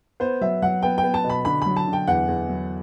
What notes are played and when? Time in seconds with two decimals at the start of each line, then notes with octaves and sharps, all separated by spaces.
0.20 B3 C5
0.41 F#3 E5
0.62 F#3 F#5
0.83 B3 G5
0.98 G5
1.04 B3
1.14 A5
1.24 B2
1.30 B5
1.45 D3 B5
1.62 F#3 B5
1.77 A5
1.87 D3
1.93 G5
2.08 E2 F#5
2.28 E2
2.49 F#3